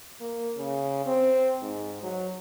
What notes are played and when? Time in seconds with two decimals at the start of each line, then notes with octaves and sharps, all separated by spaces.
0.21 A#3
0.56 C#3
1.06 C4
1.62 G#2
2.03 F#3